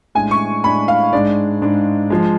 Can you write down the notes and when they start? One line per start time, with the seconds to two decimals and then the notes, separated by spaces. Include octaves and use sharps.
0.15 A2 G#3 D4 G#5
0.31 C#6
0.64 A2 G#3 D4 B5
0.88 F5
1.13 G#2 G#3 D4 D5
1.62 G#2 G#3 D4
2.10 F3 G#3